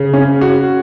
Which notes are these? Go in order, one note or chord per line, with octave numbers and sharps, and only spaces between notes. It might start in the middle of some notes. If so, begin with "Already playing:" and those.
Already playing: C#3
C#4
F#4